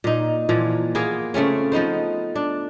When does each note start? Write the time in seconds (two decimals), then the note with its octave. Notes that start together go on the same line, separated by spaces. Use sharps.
0.04 A#2 D#4
0.49 A#2 E3 F3
0.95 A#3 B3 F4 G#4
1.34 C#3 A3 C4 C#4
1.72 F3 B3 D#4 C5
2.36 D4